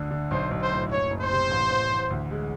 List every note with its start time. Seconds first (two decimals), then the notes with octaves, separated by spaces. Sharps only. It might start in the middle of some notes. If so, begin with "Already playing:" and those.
Already playing: D2 D3
0.11 D3
0.31 B1 C5
0.51 B1
0.62 C5
0.71 A2
0.91 F#1 C#5
1.10 F#1
1.21 C5
1.31 C3
1.51 A1
1.70 A1
1.91 A1
2.10 D2
2.31 G#3